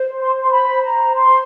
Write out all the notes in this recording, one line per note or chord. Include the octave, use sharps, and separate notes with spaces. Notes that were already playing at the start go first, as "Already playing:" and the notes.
Already playing: C5
C6
C6
B5
A#5
C6